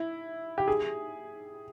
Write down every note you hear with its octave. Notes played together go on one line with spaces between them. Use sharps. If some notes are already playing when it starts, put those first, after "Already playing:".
Already playing: E4
G4
G#4